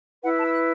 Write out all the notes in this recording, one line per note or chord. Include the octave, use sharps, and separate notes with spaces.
E4 B4 F#5
A5
E6
F#6